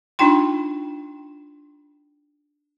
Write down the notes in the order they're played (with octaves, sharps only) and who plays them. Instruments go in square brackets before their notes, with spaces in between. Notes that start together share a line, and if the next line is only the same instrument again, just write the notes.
[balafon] D4 D#4 F4 G5 C6